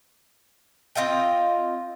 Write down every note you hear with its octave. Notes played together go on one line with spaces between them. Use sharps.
C4 F4 D#5 G5